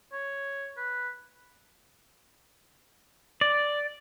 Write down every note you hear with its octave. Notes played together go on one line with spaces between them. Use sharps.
C#5
B4
D5